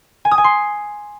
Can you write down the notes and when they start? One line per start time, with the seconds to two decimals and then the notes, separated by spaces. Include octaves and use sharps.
0.25 G#5
0.31 D#6
0.38 G#5
0.44 C6